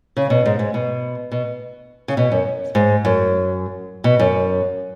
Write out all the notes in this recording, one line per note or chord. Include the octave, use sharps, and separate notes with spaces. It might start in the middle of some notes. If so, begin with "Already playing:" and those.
C#3
B2
G#2
G#2
B2
B2
C#3
B2
F#2
G#2
F#2
B2
F#2